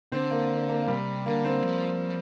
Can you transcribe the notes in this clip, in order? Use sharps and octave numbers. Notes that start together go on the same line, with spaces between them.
D3 C4
A#3
A#3
A#3
C3 G3
D3 A#3
C4
F3